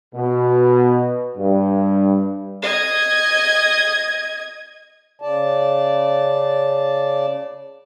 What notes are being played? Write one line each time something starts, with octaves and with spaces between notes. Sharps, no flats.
B2
G2
D#5 G#6
C#3 D5 A5